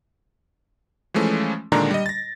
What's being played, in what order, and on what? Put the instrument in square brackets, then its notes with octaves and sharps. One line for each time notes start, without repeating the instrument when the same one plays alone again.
[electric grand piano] E3 F3 G#3 A3 C#4
A#2 D3 D#3 G#3 D4 A#5
G3 D#5
A6 A#6